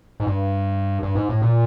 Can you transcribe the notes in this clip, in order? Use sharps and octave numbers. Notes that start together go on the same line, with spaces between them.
G#2
G2
G2
G#2
A2
A#2